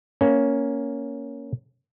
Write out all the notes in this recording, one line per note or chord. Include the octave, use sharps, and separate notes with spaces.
A#3 C#4